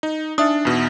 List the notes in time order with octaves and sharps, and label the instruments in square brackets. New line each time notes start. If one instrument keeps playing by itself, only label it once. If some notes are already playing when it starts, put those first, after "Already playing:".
[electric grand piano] D#4
[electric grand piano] D4 [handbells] D#4 E5 D#6
[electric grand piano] E2 B2